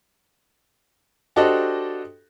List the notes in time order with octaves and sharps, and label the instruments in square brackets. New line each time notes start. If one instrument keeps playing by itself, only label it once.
[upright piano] D4 F#4 G4 A4 C5 D#5